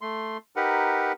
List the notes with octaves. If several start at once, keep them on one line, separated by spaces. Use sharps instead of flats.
A3 C6
D#4 G4 A#4 B4 F#5